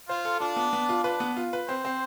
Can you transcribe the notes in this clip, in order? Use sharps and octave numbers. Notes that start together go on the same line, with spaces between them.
F4 C5
A4
D4 F4
B3
B3
F4
D4 B4
B3
F4
B4
C4 C5
C4